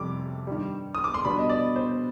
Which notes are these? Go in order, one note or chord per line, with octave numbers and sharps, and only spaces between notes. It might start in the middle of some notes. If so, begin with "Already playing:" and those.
Already playing: F2 C3 G3 D6
G2 D#3 G3
D#6
D6
C6
B2 G3 B3 D4 B5
D#5
D5
C5